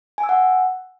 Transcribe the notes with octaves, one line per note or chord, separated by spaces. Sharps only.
G#5
E6
F#5